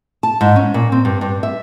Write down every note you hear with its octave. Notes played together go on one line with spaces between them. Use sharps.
A5
G#2
C#4
A#2
C4
G2
G2
E5